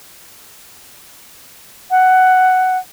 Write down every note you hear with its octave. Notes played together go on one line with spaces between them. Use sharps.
F#5